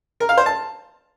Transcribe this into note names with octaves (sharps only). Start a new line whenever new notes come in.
A#4
F5
C5
A5